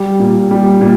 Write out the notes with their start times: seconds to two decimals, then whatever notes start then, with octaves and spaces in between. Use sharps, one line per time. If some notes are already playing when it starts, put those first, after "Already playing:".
Already playing: G3
0.19 A#2
0.51 G3
0.81 A#2